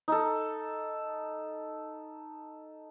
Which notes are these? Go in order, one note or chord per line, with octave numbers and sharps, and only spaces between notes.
D#4 A4